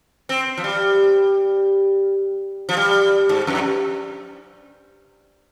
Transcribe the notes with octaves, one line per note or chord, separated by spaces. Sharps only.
C4
F3
G3
F3
G3
G#2
F2